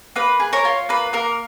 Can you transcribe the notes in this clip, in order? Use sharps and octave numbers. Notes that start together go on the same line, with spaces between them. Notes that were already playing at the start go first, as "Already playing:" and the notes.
A#3 B4
G#4
A#4 C#5
F4
A#3 B4
A#3 A#4